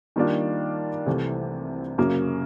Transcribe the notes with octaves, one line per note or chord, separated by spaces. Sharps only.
D#3 G3 A#3 D4 F4
C2 C3 E3 A3
F#2 C#3 F#3 A#3 C#4